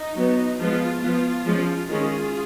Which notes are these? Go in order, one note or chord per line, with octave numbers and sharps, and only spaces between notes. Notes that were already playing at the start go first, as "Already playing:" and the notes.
Already playing: D#4
F#3 B3
F3 G#3 B3 F4
F3 B3 F4
F3 G#3 C#4
D#3 G#3 C#4 F4 G#4